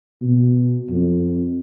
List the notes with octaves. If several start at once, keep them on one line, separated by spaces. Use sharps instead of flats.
B2
F2